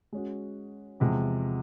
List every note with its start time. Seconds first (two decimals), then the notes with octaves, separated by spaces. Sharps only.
0.13 G#3 C#4 F#4
1.00 E2 C3 F3 G#3